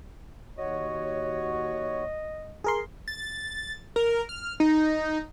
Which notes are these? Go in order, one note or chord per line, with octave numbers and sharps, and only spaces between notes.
D#2 F#4 C#5 D#5
G#4 A#4 C6
A6
A#4
F6
D#4